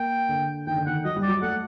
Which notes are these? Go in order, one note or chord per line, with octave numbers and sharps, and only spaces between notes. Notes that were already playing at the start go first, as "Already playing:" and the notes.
Already playing: A#3 G5
D3
D#3 G5
D3
D#3 F#5
F#3 D#5
G3
D5
F#3
A3 F#5